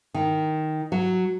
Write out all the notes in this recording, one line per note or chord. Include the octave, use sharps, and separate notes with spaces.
D#3
F#3